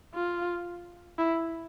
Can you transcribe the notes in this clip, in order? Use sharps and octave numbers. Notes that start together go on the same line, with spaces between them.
F4
E4